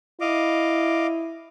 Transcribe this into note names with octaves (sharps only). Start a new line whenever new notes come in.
E4 D#5 F5 D6